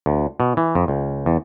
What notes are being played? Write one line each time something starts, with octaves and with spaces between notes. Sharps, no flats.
D2
B2
E3
F2
C#2
E2